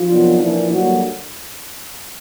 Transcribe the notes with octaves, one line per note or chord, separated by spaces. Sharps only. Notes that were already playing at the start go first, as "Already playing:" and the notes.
Already playing: F3 F4
C3 D#3 F#3 B3 D4
A#2 E3 F3 A#3 D4 E4
D3 F#3 G3 A#3 F#4